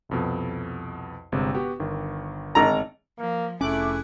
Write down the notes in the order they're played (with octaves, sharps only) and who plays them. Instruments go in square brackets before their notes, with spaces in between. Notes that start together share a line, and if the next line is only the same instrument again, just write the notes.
[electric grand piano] C2 F2 B2
G1 C3 G#3
B3 F#4 G4
G1 D#3
[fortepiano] G#1 A#5
[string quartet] F3 [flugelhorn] A#3
[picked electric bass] F1 C#4 [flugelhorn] A3 [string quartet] E4 G#4 [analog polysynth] D6 F#6